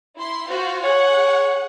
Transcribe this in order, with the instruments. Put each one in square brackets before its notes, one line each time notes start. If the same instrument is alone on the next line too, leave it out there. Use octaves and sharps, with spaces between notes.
[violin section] E4 C6
F4 F#4 C5
[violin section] G#4 F#5 [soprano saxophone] C#5